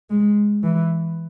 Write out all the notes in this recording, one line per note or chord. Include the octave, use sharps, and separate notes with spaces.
G#3
E3